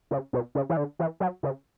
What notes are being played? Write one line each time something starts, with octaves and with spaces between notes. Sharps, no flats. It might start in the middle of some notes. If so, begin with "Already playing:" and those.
C#3
B2
C#3
E3
D3
E3
F#3
C#3